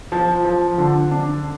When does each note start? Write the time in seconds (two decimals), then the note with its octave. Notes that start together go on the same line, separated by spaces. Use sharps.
0.12 F3
0.45 F3
0.78 D3
1.11 D4